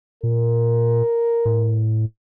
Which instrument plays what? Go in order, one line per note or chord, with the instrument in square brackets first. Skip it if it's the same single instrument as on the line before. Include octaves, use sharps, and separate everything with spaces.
[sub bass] A#2 [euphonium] A#4
[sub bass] A2